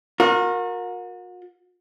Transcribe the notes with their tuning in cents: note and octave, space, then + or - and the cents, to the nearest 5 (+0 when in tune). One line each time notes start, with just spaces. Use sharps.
F#4 -40 A#4 +0